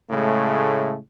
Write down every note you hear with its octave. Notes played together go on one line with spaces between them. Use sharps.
A2 C#3 G#3 A3